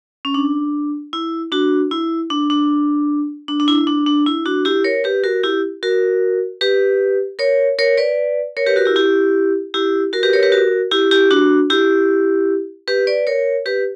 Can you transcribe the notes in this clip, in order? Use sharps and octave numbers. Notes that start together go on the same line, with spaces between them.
C#4
D4
E4
D4 F#4
E4
D4
D4
D4
D4
E4
D4
D4
E4
D4 F#4
E4 G4
A#4 C#5
G4 B4
F#4 A#4
E4 G4
F#4 A#4
G4 B4
A#4 C#5
A#4 C#5
B4 D5
A#4 C#5
G4 B4
F#4 A#4
E4 G4
E4 G4
E4 G4
F#4 A#4
G4 B4
A#4 C#5
G4 B4
F#4 A#4
E4 G4
E4 G4
D4 F#4
E4 G4
G4 B4
B4 D5
A#4 C#5
G4 B4